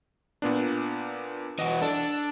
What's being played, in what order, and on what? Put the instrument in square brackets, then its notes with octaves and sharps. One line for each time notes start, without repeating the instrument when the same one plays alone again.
[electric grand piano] A#2 B3 D4
[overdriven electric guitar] E3 F#4 [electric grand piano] D#5
[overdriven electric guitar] D4 [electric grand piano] A4